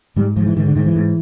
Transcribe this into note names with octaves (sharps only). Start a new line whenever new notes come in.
G#2 G3
G#2 F3
E3
G#2 D#3
D3
G#2 D#3
E3
G#2